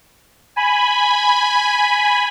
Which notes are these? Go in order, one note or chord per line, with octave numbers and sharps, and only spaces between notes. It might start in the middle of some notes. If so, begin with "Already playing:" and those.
G#5 B5